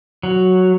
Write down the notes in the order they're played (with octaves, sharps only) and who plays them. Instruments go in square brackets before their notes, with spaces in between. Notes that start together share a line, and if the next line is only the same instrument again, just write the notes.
[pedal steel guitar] F#3